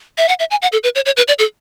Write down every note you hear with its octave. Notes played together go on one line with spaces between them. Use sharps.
E5
F#5
E5
G#5
F#5
A4
B4
C#5
C#5
B4
D5
A4